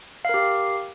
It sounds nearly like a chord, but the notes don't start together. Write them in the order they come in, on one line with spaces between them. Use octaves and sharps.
F5 A#4 G4